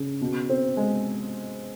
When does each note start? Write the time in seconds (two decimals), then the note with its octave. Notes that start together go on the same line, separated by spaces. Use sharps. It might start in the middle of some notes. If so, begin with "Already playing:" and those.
Already playing: C#3
0.21 B2
0.49 C4
0.77 G#3